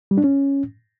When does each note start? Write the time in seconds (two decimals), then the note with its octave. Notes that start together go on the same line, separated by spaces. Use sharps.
0.11 G3
0.17 D4
0.24 C#4